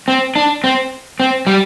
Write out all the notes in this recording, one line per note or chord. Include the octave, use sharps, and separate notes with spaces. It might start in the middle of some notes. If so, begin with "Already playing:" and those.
C4
D4
C4
C4
G3